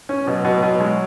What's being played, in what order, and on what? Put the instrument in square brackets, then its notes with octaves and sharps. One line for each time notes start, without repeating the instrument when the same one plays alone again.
[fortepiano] C#4
[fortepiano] B2 [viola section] F#3
[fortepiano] B2
B2
G#3